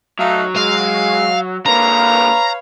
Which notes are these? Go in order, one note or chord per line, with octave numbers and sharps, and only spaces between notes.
F#3 A3 D#4 F5
G#3 F5
D3 A#3 B4 C#5 F5 A#5